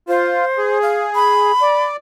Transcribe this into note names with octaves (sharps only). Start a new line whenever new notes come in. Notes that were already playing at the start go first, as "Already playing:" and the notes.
F4 C5
G#4
F5
B5
D5